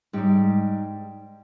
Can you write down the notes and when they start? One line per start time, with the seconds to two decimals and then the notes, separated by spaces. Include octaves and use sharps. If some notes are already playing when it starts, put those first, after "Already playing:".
0.13 G#2 G3 G4